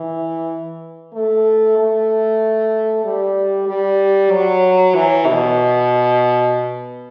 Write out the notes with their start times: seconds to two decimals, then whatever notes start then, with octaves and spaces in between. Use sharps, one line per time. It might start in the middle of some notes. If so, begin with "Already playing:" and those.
Already playing: E3
1.14 A3
1.78 A3
3.04 G3
3.68 G3
4.31 F#3
4.95 E3
5.26 B2